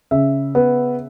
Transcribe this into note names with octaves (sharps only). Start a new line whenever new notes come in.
C#3 E5
B3